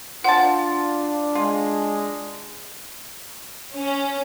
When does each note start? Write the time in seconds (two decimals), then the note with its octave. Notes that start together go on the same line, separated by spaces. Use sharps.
0.24 D4 F4 C5 F#5 A5
1.35 G#3 F4
3.77 C#4